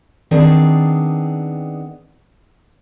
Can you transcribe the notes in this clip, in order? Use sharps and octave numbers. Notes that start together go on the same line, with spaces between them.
D#3 B3 C4 D4 G#4 D5